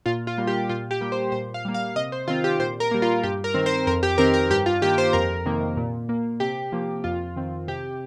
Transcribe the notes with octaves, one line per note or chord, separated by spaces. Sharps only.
A#2 F4
F4
G3 A#3
G4
A#2 F4
G4
G3 A#3
C5
A#2 C5
F5
G3 A#3
F5
C3 D#5
C5
D#3 C4 F4
G4
A#2 C5
A#4
G3 A#3
F4
G2 G4
A#4
D#3 C4
C5
F2 A#4
G4
D#3 C4 A#4
A#4
G2 G4
F4
D#3 A#3 G4
C5
F2 A#4
C3 D#3 A#3
A#2
A#3
C3 G4
F3 A#3
F2 F4
D#3 C4
C3 G4